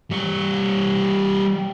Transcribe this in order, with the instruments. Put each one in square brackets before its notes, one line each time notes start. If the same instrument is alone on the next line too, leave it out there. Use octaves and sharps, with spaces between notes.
[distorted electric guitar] G3 C#5